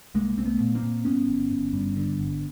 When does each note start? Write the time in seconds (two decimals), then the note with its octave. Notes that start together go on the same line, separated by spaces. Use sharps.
0.14 C2 G#3 A#3
0.37 C2 C4
0.45 A3 B3
0.61 A#2
0.75 A#3 C4
0.83 A#2
1.05 G2 B3 C#4
1.28 G1
1.51 G1
1.73 G2
1.97 D3
2.19 G1